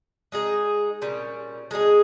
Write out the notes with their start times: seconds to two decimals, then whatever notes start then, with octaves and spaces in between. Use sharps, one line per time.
0.32 G#3 D#4 G#4
1.02 A#2 G3 C#4
1.71 G#3 D#4 G#4